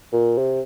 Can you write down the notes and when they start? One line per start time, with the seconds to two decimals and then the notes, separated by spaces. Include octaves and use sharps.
0.13 A#2
0.38 C3